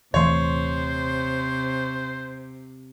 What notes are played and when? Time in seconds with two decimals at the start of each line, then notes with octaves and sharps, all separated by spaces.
0.14 D#1 C3 E3 A3 C5 C#5 C6